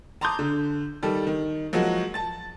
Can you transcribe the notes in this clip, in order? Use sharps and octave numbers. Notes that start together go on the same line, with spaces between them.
A5 A#5 C6 D6 D#6 G6
D3
D#3 G3 A4
D#3
F3 F#3 G#3 A#3 F#4
A5 A6